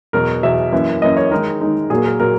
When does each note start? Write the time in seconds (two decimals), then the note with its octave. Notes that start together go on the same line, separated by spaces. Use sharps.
0.13 E2 B2 F#3 A#4
0.43 E2 B2 F#3 E5
0.72 F#2 E3 A#3
1.02 F#2 E3 A#3 D#5
1.17 C#5
1.31 D#3 G#3 D#4 A#4
1.61 D#3 G#3 D#4
1.90 A#2 F#3 A#3 G#4
2.05 A#4
2.20 A#2 F#3 A#3 A#4